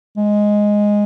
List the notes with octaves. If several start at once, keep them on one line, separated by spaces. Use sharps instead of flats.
G#3